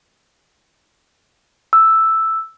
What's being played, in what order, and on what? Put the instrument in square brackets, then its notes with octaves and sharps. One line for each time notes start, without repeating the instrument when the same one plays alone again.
[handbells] E6